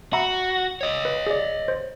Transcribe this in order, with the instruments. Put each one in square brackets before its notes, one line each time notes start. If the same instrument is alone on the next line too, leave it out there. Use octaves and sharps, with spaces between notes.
[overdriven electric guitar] F#4 [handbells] E5 A#5 B5
[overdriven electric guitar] C#5 D#5
[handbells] B4
G#4 D5
C5